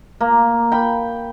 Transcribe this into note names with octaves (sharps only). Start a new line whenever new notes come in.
A#3
G5 B5